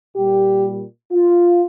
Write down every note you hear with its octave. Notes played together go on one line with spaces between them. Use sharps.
A#2 G3 G4
F4